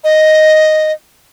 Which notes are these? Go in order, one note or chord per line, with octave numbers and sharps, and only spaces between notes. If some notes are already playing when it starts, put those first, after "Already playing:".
D#5